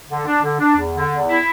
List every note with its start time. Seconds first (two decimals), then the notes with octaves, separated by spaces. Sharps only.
0.09 D3
0.26 D4
0.43 D3
0.60 D4
0.77 E2
0.94 D3
1.11 E2
1.27 E4